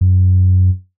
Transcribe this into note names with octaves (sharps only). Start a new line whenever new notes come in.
F#2